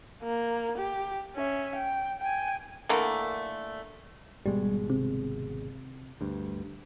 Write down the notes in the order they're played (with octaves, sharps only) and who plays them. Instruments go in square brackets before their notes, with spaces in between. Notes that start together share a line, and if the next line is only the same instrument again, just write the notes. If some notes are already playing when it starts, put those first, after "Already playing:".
[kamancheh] A#3
G4
C#4 E5
G5
G5 G#5
[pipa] D3 E3 A3 A#3
[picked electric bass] G#1 B2 G#3 [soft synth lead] G3
[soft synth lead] C3
[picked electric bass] D2 G2